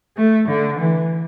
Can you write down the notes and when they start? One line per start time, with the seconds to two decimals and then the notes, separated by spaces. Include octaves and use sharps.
0.17 A3
0.48 D3
0.79 E3